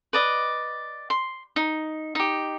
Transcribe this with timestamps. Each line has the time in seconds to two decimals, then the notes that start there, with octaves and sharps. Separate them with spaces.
0.13 B4 D5 D#5
1.10 C6
1.56 D#4
2.15 D#4 G4